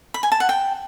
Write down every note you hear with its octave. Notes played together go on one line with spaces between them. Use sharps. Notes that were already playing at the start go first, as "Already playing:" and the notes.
B5
G#5
A5
F#5
G5